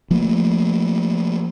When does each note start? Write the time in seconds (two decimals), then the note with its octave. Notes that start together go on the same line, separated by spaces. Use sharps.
0.11 F3 A3 A#3